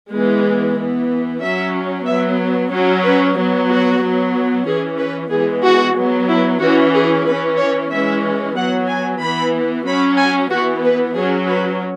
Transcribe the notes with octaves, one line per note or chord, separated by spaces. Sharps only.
E3 G#3 B3
E3 B3
F#3 C#4 E5
F#3 B3 E5
F#3 C#4
B4
F#3 B3
F#4
F#3 B3
E3 C#4 G#4
B4
E3 G#3 B3 G#4
F#4
F#3 B3
E4
E3 C#4 F#4
G#4
E3 C#4 B4
C#5
E3 G#3 C#4 E5
F#3 B3 F#5
G#5
E3 B3 B5
F#3 C#4 B5
G#5
E3 B3 F#4
B4
F#3 C#4 G#4
B4